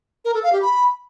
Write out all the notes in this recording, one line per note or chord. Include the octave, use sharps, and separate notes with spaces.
A#4
A4
F5
G4
B5